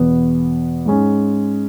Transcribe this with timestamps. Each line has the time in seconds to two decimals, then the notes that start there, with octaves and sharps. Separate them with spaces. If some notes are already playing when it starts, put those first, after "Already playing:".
Already playing: E2 B2 B3
0.86 G#2 G#3 C#4